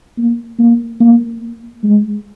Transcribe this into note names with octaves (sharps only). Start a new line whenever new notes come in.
A#3
A#3
A#3
G#3